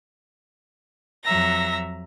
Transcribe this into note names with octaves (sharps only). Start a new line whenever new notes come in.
F2 F#3 E5 A#5 A#6